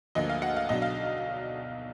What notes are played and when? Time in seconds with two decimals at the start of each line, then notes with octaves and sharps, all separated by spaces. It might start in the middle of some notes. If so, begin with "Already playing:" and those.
0.15 D2 D3 F3 A#3 D#5
0.30 F5
0.42 F#5
0.56 F5
0.69 B1 B2 F#3 D4 D#5
0.82 F5